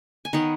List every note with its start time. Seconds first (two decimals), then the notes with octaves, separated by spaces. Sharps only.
0.25 G#5
0.33 D#3 B3 C#5 F#5